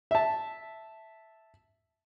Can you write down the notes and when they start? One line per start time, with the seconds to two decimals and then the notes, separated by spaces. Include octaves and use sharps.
0.11 E5 A5